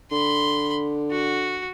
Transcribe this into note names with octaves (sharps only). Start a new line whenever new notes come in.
D3 B5 C6
F#4